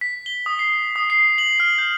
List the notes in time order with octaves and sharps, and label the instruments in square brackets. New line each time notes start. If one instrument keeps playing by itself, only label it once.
[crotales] B6
G7
D#6
C7
D#6
C7
F#7
F6
G6